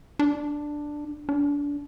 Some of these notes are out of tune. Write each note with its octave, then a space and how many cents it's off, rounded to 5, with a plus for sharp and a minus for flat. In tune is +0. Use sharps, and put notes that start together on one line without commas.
D4 +5
D4 -30